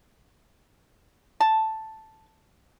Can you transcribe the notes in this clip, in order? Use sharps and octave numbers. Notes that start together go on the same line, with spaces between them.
A5